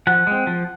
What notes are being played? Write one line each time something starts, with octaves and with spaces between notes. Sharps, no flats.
F3 F#5
G#3 C4
F3